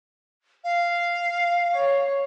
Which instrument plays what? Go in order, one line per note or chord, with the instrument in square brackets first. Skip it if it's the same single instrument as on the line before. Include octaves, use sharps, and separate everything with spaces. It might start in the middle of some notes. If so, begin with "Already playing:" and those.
[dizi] F5
[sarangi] C#5